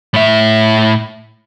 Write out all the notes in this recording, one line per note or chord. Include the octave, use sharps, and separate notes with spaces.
A2 E5